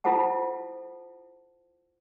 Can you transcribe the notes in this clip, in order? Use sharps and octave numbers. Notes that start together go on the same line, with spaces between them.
E4 F4 A4 C5 F#5 A5